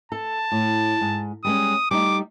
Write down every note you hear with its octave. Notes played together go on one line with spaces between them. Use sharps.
A4 A5
A2
G#2
G3 G#3 C#4 D#6
G3 A3 D#4 D6